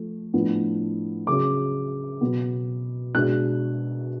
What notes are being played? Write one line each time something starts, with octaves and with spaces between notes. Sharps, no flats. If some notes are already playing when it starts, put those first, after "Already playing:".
Already playing: F3 A3
A2 F3 B3 D4
C#3 F#3 C#4 D6
B2 F#3 B3
B2 G#3 D4 F#6